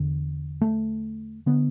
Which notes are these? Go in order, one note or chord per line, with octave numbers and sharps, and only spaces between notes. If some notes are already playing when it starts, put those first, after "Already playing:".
Already playing: E2 D3
A3
D3 B3